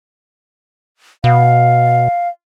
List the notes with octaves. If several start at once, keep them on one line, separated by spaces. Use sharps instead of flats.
B2 F5